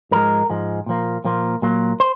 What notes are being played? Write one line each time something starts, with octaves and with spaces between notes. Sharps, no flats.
G#2 F3 G#3 A#4
G#2 F3 G#3
A#2 F3 A#3
A#2 F3 A#3
A#2 F#3 A#3
C5